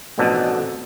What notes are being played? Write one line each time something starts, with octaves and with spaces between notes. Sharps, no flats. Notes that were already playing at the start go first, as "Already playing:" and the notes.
A1 F2 B2 D4 D#4 A4